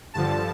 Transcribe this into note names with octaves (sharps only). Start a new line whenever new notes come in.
G2 D3 F3 A5